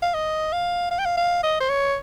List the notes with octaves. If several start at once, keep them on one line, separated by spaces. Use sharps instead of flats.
F5
D#5
F5
F5
G5
F5
F5
D#5
C5
C#5